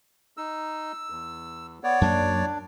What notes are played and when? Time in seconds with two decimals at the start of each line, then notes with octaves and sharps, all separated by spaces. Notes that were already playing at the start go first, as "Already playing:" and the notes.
0.37 D#4 E6
1.10 E2
1.84 B3 C#5 D5
2.01 F#2 F#3 A#3 D4